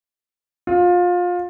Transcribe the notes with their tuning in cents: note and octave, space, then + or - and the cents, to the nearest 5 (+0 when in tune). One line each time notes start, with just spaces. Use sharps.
F4 +25